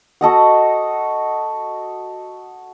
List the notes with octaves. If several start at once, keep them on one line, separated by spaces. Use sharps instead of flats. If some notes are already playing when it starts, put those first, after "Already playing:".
F#4 A4 D#5 F#5